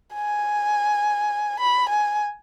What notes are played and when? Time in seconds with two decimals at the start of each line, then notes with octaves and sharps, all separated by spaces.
0.14 G#5
1.60 B5
1.89 G#5